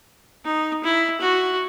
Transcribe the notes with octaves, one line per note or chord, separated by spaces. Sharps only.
D#4
E4
F#4